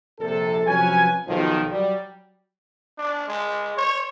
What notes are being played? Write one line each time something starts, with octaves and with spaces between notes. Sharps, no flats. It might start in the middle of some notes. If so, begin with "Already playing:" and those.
A#1 C3 A4
C3 F3 F#3 C#4 B4 G#5
B1 D#3 F3
F#3 G3
D4
G#3
C#5